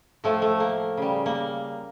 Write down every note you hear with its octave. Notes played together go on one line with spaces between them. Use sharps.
A2 F3 A3
A3
A#3
C#3 G3
A#3